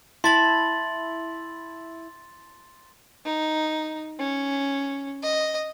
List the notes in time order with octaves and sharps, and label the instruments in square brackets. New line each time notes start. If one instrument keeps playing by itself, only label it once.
[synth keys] E4 [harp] A5 [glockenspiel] C6 A6 F#7
[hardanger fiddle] D#4
C#4
D#5